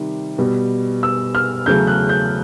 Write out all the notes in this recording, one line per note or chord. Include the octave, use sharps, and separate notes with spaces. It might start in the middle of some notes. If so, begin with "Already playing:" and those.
Already playing: C3 D#3 G3
B2 G3
E6
F6
E2 C#3 F#3 A3 G6
F#6
G6